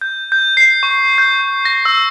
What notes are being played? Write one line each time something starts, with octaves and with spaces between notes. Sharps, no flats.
G6
G6
C7
C#6
G6
A#6
E6